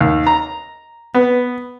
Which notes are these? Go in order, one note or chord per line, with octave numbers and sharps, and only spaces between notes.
D#2
A#5
B3